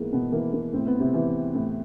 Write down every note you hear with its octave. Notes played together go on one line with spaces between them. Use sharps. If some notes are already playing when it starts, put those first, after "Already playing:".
Already playing: G#2 E3 A#3 B3
B2 B3
E3 A#3
A#3
A2 C4
B3
C3 C4
E3
A2